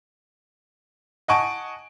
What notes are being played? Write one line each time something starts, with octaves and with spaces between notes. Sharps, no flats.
D#5 F#5 G#5 A5 C#6 D7